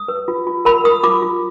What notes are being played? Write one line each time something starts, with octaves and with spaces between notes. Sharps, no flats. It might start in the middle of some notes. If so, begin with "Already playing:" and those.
Already playing: D#6
B4
F4
F4
A#4 B5
A#4 D#6
F4 D6
F4